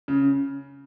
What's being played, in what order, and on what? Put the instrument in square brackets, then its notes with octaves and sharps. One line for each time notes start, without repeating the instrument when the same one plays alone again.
[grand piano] C#3